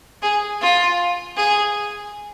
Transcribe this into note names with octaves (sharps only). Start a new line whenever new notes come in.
G#4
F4
G#4